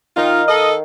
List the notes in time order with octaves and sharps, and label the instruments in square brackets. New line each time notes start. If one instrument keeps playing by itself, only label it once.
[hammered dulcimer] D#3 F5 [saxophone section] D#4 F4
[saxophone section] A4 D#5